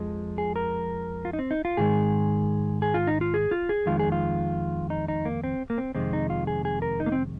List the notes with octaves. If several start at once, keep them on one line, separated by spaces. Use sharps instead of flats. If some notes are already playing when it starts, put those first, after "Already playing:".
Already playing: F2 F3 G#3
G#4
A#4
F4
D#4
C4
D#4
F4
G#2 D#3 G#3 G#4
G#4
F4
D#4
F4
G#4
F4
G#4
F2 D#3 G#3 F4
G#4
F4
D#4
D#4
A#3
C4
A#3
C4
F2 C3 D#3 G#3 C4
D#4
F4
G#4
G#4
A#4
D#4
A#3
C4